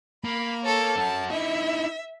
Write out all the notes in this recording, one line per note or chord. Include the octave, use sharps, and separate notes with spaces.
A#3 B5
A4 C#5
C#4 F#4 A5
D#4 E4 E5